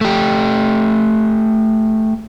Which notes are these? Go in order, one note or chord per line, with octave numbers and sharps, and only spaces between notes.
A3 G4